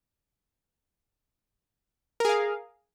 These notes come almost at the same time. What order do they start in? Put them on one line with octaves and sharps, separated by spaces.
A#4 G#4 F5